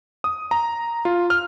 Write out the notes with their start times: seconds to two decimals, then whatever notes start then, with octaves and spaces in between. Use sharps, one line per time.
0.24 D#6
0.51 A#5
1.05 F4
1.30 F6